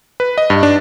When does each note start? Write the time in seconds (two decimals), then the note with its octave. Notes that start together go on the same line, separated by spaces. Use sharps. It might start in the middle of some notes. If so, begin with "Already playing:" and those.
0.20 B4
0.38 D#5
0.50 G2
0.63 D4